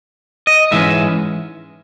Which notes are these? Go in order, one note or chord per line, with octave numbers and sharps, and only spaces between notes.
D#5
G#2 E3 G#3 C#4 E5